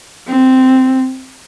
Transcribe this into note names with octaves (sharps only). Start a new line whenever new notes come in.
C4